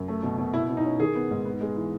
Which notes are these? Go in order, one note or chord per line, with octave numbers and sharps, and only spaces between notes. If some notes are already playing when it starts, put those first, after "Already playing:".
Already playing: F#2
A3
B2
B2
B2 E4
B2
D#4
C#4
D#3 G#4
B3
G#2
B3
G#3
E3